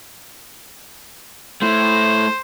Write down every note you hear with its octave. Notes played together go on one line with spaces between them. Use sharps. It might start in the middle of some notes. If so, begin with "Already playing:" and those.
A3 E4 C5